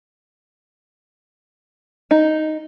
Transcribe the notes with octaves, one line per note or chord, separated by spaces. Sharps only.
D#4